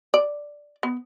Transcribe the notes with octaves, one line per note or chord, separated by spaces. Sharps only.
D5
B3